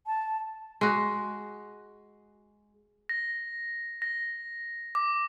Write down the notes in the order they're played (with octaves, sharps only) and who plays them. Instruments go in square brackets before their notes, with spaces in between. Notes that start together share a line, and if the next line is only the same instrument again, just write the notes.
[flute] A5
[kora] G#3 F#4
[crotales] A#6
A#6
D6